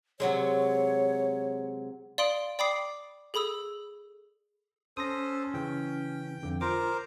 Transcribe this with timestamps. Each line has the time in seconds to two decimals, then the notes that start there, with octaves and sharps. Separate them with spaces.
0.20 C3 F#3 G#3 C#5
2.18 D5 F5 C6 D#6 D7 F#7
2.59 D5 G5 B5 D6 D#6 C7
3.34 G#4 A4 B5 D#6 E6
4.97 C#4 A4 C5 D#6 A#6
5.54 C#3 E3 G5
6.43 F2 D3
6.61 F4 A#4 C5 D6